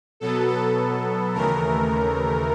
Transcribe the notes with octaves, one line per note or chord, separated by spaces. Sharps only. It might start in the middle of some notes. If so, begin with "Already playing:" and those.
B2 F#3 B3 A4
A4
D#2 C#3 E3 A3 A#4